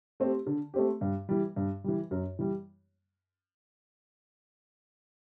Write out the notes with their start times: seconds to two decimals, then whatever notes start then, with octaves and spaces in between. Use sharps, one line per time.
0.20 A3 C4 G4
0.46 D3
0.74 A3 C4 G4
1.01 G2
1.29 E3 G3
1.56 G2
1.84 E3 G3
2.11 F#2
2.39 E3 G3